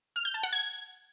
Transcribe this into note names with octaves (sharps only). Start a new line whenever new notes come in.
F6
G6
A5
F#5
G#6